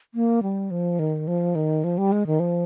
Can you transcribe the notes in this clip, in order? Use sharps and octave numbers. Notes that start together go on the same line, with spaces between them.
A#3
G3
F3
D#3
F3
D#3
F3
G3
G#3
D#3
F3